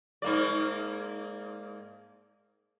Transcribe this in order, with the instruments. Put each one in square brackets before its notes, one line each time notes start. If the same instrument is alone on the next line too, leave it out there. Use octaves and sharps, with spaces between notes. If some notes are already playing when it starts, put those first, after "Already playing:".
[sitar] G#2 A#3 D5